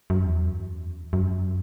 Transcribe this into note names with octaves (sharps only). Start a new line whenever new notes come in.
F#2
E2
F#2